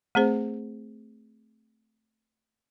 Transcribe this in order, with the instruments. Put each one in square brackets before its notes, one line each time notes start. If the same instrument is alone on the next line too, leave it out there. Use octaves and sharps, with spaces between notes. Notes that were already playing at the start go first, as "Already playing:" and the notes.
[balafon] A3 C4 G#4 C5